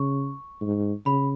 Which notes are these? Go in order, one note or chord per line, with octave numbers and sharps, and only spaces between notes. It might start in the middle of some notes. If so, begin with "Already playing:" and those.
Already playing: C#3 C#6
G#2
C#3 B5